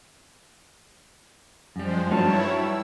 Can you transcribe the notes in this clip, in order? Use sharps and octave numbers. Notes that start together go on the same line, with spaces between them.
F#2 F3 G3 G#3 C5
G2 F#3 G3 D#4 E4 C#5 A5
E6